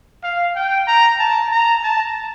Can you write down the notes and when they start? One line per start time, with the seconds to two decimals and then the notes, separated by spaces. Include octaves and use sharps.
0.23 F5
0.56 G5
0.87 A#5
1.19 A5
1.52 A#5
1.84 A5